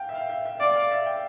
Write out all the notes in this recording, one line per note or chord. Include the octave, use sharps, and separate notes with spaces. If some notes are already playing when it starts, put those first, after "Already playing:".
Already playing: F5 G5
E5
F5
E5
E5
D5 F5
F5
E5
G5